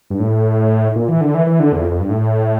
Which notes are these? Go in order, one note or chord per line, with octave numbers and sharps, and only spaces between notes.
G2
A2
A#2
E3
D3
E3
E3
D3
E2
F2
F2
G2
A2